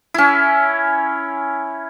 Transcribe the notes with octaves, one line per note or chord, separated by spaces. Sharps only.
C#4 E4